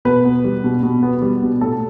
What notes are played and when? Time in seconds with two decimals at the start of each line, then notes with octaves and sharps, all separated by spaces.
0.05 B2 B4
0.25 B3
0.44 G3
0.64 B2
0.83 B2
1.03 B3
1.22 G3
1.42 B2
1.61 A2 A4